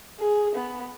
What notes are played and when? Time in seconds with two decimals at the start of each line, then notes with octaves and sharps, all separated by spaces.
0.20 G#4
0.56 B3